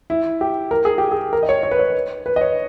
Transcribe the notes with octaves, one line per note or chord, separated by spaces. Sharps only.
E4
G4
A#4
G#4
G4
G#4
A#4
D#5
C#5
C#5
B4
C#5
B4
D#5
C#5